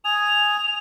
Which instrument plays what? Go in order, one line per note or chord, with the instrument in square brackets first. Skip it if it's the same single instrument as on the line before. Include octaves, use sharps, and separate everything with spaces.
[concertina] G#5 D#6 [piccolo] F7